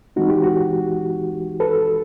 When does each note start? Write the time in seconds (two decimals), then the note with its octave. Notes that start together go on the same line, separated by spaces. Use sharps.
0.16 E3 G#3 C4 D#4 F#4
0.30 G4
0.43 F#4
1.60 A4 B4